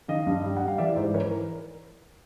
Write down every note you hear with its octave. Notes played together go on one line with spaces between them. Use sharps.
D#3 D#5 F5
G2
G3
G3 F#5
F5
E3 D5 E5
G#2 C5 D5
E3 B4 C#5
A#4